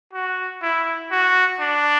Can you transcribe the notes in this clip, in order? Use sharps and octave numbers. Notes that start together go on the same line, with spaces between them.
F#4
E4
F#4
D4